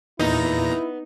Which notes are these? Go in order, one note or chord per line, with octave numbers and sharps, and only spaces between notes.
E2 A#2 B3 D#4 E4 A#5